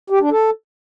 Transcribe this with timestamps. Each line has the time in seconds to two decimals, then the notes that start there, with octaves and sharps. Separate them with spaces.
0.10 G4
0.21 D4
0.31 A4